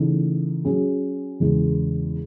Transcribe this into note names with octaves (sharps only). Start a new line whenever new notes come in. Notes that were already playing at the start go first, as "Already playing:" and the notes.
Already playing: C#3 E3 A3 D#4
F#3 C#4 G#4
E2 C#3 G#3